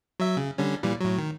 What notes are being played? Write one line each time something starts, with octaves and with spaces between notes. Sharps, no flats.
F#3 E5
C#3
D3 G3 C#4
A#2 E3 G3
A2 F#3
D#3